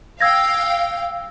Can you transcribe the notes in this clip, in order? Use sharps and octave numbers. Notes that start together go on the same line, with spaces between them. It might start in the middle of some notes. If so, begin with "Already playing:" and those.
F5 G5 E6 G#6 A#6